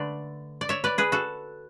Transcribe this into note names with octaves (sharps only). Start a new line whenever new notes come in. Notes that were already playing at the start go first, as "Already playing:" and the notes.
Already playing: D3 A3 B4 D5
D5
C#5 E5
B4 D5
G#4 B4
F#4 A4